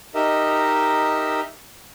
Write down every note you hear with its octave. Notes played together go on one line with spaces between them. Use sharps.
D#4 G4 A#4 D#5 E5